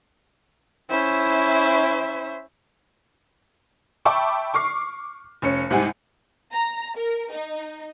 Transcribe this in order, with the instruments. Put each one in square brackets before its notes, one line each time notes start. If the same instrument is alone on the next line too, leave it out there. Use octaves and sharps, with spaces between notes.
[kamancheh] C#4 E4 [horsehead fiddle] C5 E5
[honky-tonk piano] E5 G5 A5 B5 C#6 D6
C#6 D6 F6 C7
F1 C#4 C#7
C2 G#2 C3 F#5 G#5
[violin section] A#5
A#4
D#4